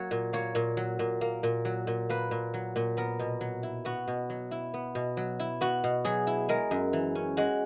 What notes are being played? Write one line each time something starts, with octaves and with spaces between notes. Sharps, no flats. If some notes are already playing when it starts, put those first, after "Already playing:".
Already playing: F#3 A#3 C#5
A#2
A#3 C#5
A#2
F#3
A#2
A#3
A#2
F#3
A#2
A#3 B4
A#2
F#3
A#2
B3 A#4
B2
F#3
E4
B3 F#4
B2
F#3
E4
B3
B2
F#3
E4
B3 F#4
B2
F#3 G#4
E4
G#3 A#4
F#2
E3
C#4
G#3 F#4